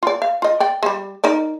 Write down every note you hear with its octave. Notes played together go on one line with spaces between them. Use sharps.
F4 D5
F5
F4 D#5
D5 G5
G3 G#3
D#4 A#4 D5